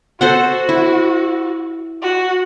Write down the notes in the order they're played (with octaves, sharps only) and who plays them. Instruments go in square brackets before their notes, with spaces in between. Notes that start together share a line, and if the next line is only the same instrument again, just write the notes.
[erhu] F#4 [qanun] A4 C5 F#5
[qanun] E4
[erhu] F#4